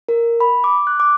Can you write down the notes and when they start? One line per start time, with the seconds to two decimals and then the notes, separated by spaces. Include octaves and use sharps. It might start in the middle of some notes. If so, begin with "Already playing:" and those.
0.09 A#4
0.40 B5
0.64 D6
0.87 F#6
1.00 D6